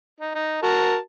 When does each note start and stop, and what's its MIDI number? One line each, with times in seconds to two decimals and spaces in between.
0.20 0.33 63
0.35 0.62 63
0.63 0.97 66
0.63 0.97 70
0.63 0.97 81